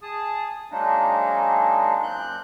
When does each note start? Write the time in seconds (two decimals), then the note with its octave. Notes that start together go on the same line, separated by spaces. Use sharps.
0.02 G#4 A5 D#6
0.71 F#3 G#3 A#3 D4 D#4
2.03 F#2 A#2 C4 F#6 G6